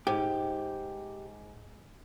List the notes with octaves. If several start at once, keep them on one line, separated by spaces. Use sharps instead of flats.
G#2 G4